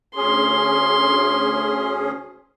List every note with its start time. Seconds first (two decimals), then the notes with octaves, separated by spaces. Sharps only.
0.16 D2 C#4 G#4 C6